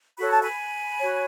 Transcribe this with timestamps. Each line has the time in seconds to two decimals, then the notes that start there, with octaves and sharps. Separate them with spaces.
0.18 F#4 A4 C#5 B5
0.30 A5
0.42 G#5 B5
0.99 F#4 C#5